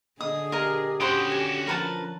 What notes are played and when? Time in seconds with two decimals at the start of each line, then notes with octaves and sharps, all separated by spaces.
0.21 D3 G#4 D#5 D#6
0.52 G4 A#4 D#5
1.00 D3 C#4 F#4 C5 G5 B5 D#6
1.32 G#5
1.67 F3 A#4 B4 A5